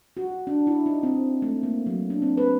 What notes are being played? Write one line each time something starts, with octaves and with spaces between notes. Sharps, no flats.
F#4
D4
E4
D#4
C4
A3
A#3
F#3
D4
C4
B4